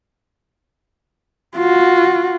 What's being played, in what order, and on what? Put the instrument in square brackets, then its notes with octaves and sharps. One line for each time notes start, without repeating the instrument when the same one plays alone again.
[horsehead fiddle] F4 F#4